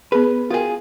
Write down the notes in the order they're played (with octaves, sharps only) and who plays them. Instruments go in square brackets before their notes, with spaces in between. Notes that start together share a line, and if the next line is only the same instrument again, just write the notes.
[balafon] B3 G#4 [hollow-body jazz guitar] B4
[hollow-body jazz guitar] F4 G#4 [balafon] F#4 A#4 G5